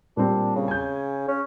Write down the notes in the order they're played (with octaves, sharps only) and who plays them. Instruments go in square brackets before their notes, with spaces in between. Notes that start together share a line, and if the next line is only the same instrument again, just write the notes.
[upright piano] A#2 G3 C4 [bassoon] D4
[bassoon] C#3
[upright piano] G#5 G6
[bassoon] C#4